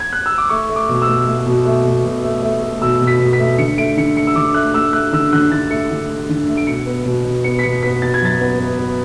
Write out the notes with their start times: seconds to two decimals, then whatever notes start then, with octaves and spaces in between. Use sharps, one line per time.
0.00 G#6
0.13 F#6
0.26 E6
0.38 D6
0.49 A3 C#6
0.70 A3
0.76 D6
0.89 B2
1.02 E6
1.08 A3
1.27 A3
1.46 B2
1.66 A3
1.85 B2
2.04 B2
2.24 A3
2.43 A3
2.62 A3
2.81 B2 E6
3.01 B2
3.07 B6
3.20 B2
3.33 B6
3.40 A3
3.58 D3 C#7
3.78 A3 D7
3.97 D3 C#7
4.17 A3 C#7
4.27 E6
4.36 D3 D6
4.54 A3 F#6
4.74 A3 E6
4.93 A3 F#6
5.12 D3 E6
5.33 D3 F#6
5.52 D3 A6
5.70 A3 C#7
5.91 D3
6.10 A3
6.29 D3
6.48 A3
6.57 D7
6.67 B2 C#7
6.86 B3
7.05 B2
7.25 B2
7.44 B3 C#7
7.59 B6
7.63 B2 C#7
7.83 B3 B6
8.02 B2 A6
8.14 G#6
8.21 F#3 A6
8.41 B3
8.60 B3
8.79 B3